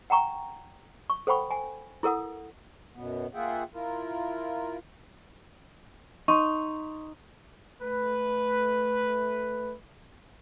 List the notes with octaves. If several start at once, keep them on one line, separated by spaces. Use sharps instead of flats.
F#5 G5 A#5 C#6
C#6
A4 C5 F#5 G5 B5 C#6
G#5
E4 A4 A#4 F#5 D#6
F#2 B2 B3
A#3 F4 G#4 E5 F#5 G5
E4 F4 A#4
D#4 C6 C#6
A3 B4